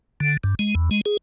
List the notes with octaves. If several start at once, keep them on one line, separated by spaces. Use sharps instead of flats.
D3
G2
G#3
E2
G#3
G#4